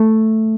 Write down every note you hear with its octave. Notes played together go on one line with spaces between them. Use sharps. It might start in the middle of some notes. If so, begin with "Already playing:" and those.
Already playing: A3